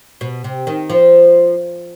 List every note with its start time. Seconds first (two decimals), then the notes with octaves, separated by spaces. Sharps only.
0.21 B2
0.44 C3
0.67 D#3
0.90 F3